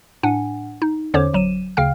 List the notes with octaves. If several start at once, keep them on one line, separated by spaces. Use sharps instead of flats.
A2 D4 F#5 G#5
D#4
E2 D3 C#4 C5 C#5 D6
G1 F#3 D#7 E7
D2 C#3 F5 G5 F6